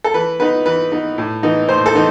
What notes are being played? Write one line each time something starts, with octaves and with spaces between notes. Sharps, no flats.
A4
E3 B4
B3 D#4 B4
E3 B4
B3 D#4
A2
E3 B3 D#4
A2 C5
A4
E3 B3 D#4